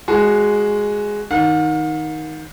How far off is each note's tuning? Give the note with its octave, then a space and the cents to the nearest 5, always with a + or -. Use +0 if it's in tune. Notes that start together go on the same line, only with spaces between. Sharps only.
G#3 +0 F#4 +0 G#5 +10
D#3 +10 F#5 -45